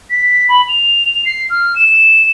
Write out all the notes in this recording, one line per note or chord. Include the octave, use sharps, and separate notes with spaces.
B6
B5
F7
C7
F6
E7